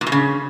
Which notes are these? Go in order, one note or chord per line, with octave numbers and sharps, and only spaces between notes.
A#2
B2
C#3